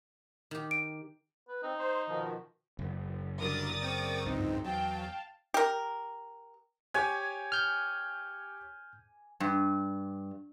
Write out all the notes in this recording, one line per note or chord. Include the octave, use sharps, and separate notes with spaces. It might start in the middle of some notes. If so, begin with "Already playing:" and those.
D#3 G4
D7
B4
C4 D#4
C5
B2 D#3 F3
F#1
D3 F#3 G3 A#4 D5 D#6 A6
C4 G5 C#6
G1 C#2 G#2 C4 D#4
E2 F#3 F5 G5 A5
G4 A#4
G4 C#5 G#5
F6 G6
G2